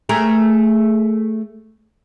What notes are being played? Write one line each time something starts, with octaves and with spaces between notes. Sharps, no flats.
A3 G#4 A#4